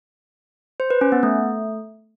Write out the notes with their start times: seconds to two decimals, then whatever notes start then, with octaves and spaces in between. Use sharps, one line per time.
0.80 C5
0.90 B4
1.01 C#4
1.12 B3
1.23 A3